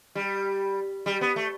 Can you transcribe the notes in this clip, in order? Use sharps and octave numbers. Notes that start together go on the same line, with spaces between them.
G3
G3
B3
A3